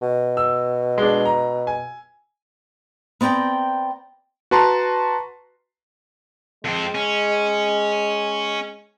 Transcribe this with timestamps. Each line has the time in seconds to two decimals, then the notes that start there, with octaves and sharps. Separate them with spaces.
0.02 B2
0.37 E6
0.98 G#3 D4
1.25 A#5
1.67 G#5
3.21 B3 C4 D5 G5 A#5
4.51 F#4 B4 A5 A#5 C6
6.65 F2 G#3 C4
6.95 C#4